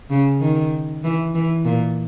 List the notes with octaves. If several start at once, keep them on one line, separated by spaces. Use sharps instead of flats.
C#3
D#3
E3
E3
A#2